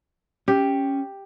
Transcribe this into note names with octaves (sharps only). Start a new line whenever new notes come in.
C#4 G4